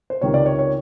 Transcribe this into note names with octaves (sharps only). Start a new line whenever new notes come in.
C5
C#2 C3 D#3 C#5
D5
C#5
C#5